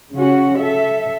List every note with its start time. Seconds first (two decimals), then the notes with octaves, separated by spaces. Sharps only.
0.14 C#3 C#4 F#4
0.60 A4 E5